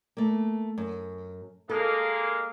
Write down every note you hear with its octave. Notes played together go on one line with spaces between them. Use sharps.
A3 A#3
F#2
G#3 A#3 A4